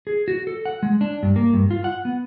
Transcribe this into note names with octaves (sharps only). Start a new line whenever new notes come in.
G#4
F#4
A4
F#5
G#3
D4
G2
A#3
G2
F4
F#5
B3